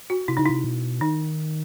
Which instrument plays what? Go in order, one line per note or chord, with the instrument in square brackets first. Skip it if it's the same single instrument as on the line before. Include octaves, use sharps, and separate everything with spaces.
[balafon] F#4
[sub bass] C3 [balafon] E4
[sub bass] C#3 [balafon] D#4
[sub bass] C3 [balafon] E4
[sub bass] B2
[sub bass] D#3 [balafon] D#4